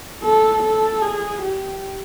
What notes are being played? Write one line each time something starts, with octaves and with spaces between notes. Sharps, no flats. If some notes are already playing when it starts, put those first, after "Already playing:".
A4
A4
G#4
G4